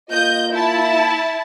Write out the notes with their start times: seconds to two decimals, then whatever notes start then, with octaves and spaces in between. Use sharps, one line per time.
0.10 A#3 F4 D#5 G6
0.51 E4 A5